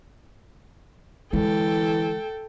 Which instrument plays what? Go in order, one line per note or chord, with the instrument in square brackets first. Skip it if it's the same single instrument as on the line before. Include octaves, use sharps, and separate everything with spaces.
[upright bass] D3 G#3 [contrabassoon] E3 [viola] A4 G5